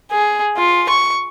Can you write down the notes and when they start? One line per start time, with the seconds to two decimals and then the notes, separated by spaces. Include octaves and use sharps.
0.11 G#4
0.57 F4
0.89 C#6